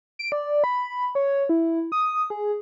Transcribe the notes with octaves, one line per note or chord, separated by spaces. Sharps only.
D7
D5
B5
C#5
E4
D#6
G#4